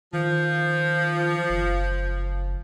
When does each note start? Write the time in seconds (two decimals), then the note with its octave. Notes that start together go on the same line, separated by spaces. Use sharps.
0.13 D#3 F3
1.50 F#1